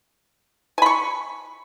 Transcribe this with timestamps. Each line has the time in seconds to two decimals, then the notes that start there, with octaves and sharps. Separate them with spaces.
0.78 G#5
0.82 B5
0.86 C#6